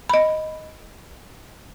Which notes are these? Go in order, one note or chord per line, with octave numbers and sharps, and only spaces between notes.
D#5 B5